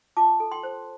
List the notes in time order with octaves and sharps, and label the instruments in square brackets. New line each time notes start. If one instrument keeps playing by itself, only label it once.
[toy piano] F4 A5 D6
A4
G5 C6
C5